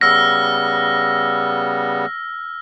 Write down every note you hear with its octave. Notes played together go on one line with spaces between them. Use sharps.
C#3 G3 B3 E6 F6 A#6